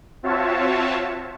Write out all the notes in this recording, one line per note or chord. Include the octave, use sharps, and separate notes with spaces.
C4 F4 F#4 C#5 E5 A5